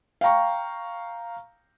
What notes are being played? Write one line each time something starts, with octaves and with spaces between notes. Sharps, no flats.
F5 G5 A#5 C#6